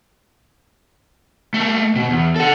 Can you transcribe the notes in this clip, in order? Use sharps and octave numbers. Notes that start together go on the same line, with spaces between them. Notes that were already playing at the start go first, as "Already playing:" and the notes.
A3 A#3
B2
E2
A4 F#5